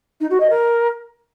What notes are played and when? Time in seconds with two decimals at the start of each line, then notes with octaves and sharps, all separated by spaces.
0.20 D#4
0.30 F#4
0.40 D#5
0.50 A#4